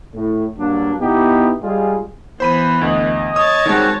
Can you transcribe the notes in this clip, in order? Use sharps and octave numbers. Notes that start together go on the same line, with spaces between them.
A2
G2 F#3 A#3 D4
B2 B3 D#4 E4 G4
G3 G#3 F4 G#4
E3 B3 C5 B5 D#7
D2 D#5
C#5 A5 D#6
D#3 G3 G#3 C4 F#4